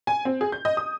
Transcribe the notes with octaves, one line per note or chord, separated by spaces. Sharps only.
G#5
C4
G#4
G6
D#5
D#6